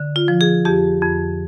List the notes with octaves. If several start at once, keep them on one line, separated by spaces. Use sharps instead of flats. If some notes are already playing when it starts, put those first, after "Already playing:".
Already playing: D3
F4
F3
G#4
F2 G4
F2